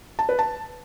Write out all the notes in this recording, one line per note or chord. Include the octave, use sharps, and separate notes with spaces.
A5
B4
A5